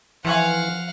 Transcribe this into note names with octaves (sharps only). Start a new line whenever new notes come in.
E3 F3 C#5 F5 F#5 G#5